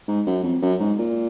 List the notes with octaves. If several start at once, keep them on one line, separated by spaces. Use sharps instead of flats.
G#2
F#2
F2
F#2
G#2
A#2